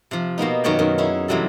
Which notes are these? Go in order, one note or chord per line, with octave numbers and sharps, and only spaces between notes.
C3 F3
B2 A#3 B3 D#4
F#2 D#3 F#4 C#5 D5 G5
F#2 D#3
C#4 D#4 E4 G#4
C3 E3 F#3 G3 A4